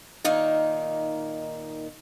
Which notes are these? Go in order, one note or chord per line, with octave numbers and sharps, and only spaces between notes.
A#2 D#3 A#3 D#4